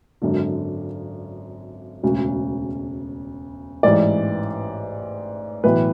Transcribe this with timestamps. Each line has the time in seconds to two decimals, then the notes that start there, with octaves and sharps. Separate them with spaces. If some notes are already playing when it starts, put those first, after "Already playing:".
0.22 G#1 F#2 D3
2.03 E1 D2 C#3
3.83 A1 G#2 E3 D5
5.64 B1 A2 E3 B4